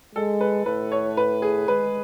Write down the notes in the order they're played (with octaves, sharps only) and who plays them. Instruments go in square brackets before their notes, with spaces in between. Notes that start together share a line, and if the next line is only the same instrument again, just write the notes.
[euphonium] G#3 [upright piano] A4
[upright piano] B4
[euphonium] A2 [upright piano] B4
[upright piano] C#5
B4
G#4
[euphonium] G#3 [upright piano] B4